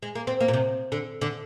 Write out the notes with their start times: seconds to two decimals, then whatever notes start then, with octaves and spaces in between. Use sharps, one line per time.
0.02 G#3
0.15 A#3
0.27 C4
0.40 A#3
0.48 A#2
0.53 C3
0.92 D3
1.21 D3